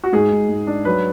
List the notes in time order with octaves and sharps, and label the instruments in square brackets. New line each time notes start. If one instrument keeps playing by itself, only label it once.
[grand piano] F#4
G#2 G#4
G#2
G#2
D4
F#3 B4